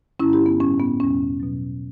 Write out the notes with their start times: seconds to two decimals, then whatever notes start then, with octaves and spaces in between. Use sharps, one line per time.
0.20 G2 D3 G3 C#4 E4
0.33 E4 G4
0.46 B3
0.60 A2 G3 C#4
0.80 B3
1.00 E2 B2 G3 C#4
1.40 B2 F#3